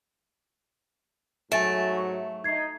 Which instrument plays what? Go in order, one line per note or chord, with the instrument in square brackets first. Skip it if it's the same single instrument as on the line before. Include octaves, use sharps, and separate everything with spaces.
[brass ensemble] G#2 F#3 [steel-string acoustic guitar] A3 [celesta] G#5 A6 D7
[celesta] C#6
[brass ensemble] D#4 [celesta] G#6 C7